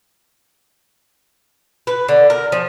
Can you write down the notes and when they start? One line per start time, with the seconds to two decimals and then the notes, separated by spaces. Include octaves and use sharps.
1.87 B4
2.09 D3
2.30 A#4
2.52 F3